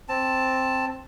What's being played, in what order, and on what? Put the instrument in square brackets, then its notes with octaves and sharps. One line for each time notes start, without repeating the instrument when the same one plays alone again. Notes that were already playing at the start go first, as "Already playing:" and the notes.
[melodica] C4 A5